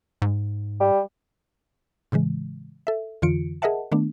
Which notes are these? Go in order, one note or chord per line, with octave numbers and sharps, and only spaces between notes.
G#2
G3
A2 C#3 E3 G#3
A4 E5
F2 D3 E3 F4 C#7 D7
G#4 A#4 D#5 E5 F#5 A5
D#3 A3 B3 D4